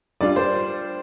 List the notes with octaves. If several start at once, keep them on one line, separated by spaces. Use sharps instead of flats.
G3 D4 F4 D5
C5